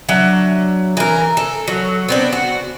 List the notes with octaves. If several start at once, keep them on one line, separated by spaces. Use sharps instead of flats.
F#3 D4 E5
E3 A#4
A4
F#3
B3 C4 D4
F#4